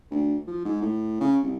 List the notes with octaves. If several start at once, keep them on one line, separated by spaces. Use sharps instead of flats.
D2
F3
G#2
A2
C#3
C2